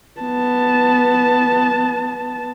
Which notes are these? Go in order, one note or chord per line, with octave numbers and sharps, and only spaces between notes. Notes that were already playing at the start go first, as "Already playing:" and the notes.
B3 A5